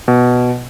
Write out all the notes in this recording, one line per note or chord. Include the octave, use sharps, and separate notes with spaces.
B2